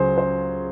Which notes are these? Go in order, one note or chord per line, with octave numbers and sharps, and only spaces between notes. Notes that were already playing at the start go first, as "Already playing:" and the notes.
Already playing: C#2 C#3 F#3 G#4 C5
C5